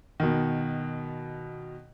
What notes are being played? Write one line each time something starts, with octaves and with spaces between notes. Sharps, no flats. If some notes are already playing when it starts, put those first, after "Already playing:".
B2 D#3